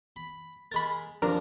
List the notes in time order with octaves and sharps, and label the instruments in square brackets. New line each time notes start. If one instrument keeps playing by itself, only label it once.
[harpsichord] B5
[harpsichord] G#3 A#4 [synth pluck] B5 A6
[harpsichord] C2 F#2 F3 [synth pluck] D4 A#4